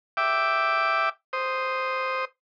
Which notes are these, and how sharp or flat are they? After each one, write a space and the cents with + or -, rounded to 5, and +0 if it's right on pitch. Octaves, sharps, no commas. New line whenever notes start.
E5 +0 G5 +0 D6 +0
C5 +0 D#6 +0